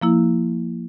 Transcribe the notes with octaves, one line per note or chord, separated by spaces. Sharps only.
F3 A#3 E4